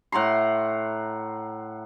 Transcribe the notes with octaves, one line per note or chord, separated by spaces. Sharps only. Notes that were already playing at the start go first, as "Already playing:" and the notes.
A2 F#5 A#5 C6